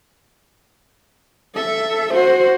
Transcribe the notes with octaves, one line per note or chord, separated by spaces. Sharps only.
A4 E5
F#4 C5